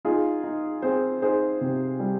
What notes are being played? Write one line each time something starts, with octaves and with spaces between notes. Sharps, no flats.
D#4 F4 G#4
D#4
C4 G#4 C5
D#4 G#4 C5
C3
G3